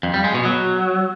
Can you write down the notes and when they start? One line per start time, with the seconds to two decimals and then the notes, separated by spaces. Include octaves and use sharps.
0.03 F2
0.14 G3
0.24 G#3
0.34 B2
0.45 F#3